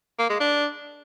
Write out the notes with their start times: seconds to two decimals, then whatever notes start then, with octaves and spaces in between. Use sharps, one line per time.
0.19 A#3
0.30 G#3
0.40 D4